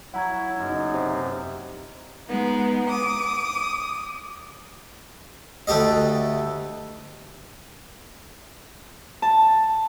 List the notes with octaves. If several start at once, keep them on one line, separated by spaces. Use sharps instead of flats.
F#3 E4 F#5 A#5 G#6
F#1 B1 F#2 D#4
C3
G#3 B3 D#4
D6 D#6
D2 A3 G4 D#5
A5